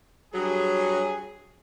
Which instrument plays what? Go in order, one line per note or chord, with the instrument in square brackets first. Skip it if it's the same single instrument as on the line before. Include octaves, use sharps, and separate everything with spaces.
[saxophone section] G2 F#3 [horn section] G#4